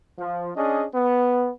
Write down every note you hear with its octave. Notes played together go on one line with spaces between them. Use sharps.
F3
C#4 D4 G#4 D#5
B3